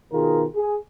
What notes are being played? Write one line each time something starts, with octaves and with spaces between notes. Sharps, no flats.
B2 D#3 F4 G#4 A#4
G#4